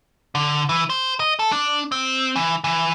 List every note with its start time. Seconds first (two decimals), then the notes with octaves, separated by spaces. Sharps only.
0.35 D3
0.69 E3
0.90 C5
1.20 D#5
1.39 A4
1.52 D4
1.92 C4
2.36 E3
2.64 E3